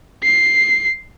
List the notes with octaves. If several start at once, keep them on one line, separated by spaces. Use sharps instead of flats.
C7